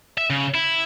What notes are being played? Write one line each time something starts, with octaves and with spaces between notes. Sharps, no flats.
E5
C#3
E4